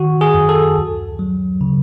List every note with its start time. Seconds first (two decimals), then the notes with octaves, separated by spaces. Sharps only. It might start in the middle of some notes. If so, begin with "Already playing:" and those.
Already playing: D#3 F#4
0.21 G#4
0.34 F#2
0.49 A4
0.77 D2
1.19 F#3
1.61 C#3